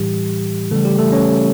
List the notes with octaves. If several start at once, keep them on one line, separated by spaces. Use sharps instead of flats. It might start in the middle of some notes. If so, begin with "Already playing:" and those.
Already playing: A2 E3 G3 G4
C#3 E3 G3 A3 A4
G3 G4
A3 A4
C#4 C#5